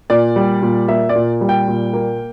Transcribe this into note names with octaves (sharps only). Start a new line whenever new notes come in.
A#2 D5
G3
A#2
A#3 E5
D5
A#2
G3
G5
A#2
A#3